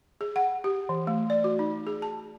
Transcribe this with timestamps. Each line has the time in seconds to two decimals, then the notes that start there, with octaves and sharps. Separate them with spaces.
0.21 G#4
0.36 F#5
0.64 G4
0.89 E3
1.07 A3
1.30 D5
1.44 F#4
1.59 D#4
1.87 G#4
2.02 A5